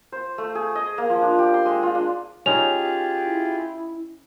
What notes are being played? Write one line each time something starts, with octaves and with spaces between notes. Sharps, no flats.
C5
A3
G#4
D#5
A#3
F3
D4
G4
C6
G#3
F4
D4
C#4 D#4 F4 G4 G#4 F7
E4